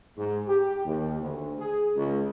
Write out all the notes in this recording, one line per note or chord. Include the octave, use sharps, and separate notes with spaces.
G#2
G4
D#2
D2
G#4
C#2